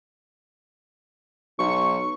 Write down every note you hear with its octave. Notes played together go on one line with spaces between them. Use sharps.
B1 C#6